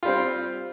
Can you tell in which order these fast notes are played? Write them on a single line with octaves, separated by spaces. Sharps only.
F4 G3 C4